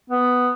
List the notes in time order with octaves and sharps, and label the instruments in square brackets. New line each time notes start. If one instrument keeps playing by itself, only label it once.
[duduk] B3